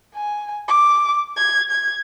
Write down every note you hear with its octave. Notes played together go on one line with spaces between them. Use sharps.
G#5
D6
G#6
G#6